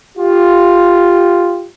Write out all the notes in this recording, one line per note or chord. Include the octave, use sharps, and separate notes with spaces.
F4 G4